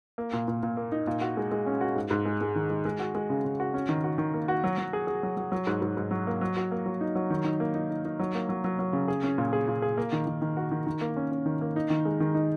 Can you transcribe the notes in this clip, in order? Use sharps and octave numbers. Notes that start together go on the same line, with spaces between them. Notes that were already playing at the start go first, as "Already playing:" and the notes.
A#3
A#2
A#2
A#2
A#3
D#4
A#2
F#4
G#3
G#3
C#4
F#4
G#2
G#2
G#3
G#3
D#3
G#3
G#3
F#4
G#3
C#3
C#3
F#4
C#4
D#3
F#4
D#3
A#3
F#4
F#3
F#3
G#4
G#4
F#3
F#3
F#3
G#2
G#2
G#2
F#3
A#3
F#3
F#4
A#3
F#3
D#4
F#3
D#3
D#4
A#3
D#4
D#4
D#4
F#3
A#3
F#3
F#3
F#3
C#3
G#4
C#4
A#2
G#4
A#2
G#4
A#3
D#3
D#3
D#3
F#4
D#3
D#3
A#3
C#4
C#4
D#3
A#3
D#4
D#3
G#3
D#3
D#4